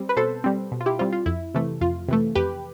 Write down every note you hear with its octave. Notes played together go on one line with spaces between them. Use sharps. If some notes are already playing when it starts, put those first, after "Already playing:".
Already playing: G3 C4
B4
B2 A4 C5
G3 C4
B2
F4
E4 G4
G3 C4 F4
F4
F2 E4
C3 E3 A3
F2 F4
C3 E3 A3
F2 G4 B4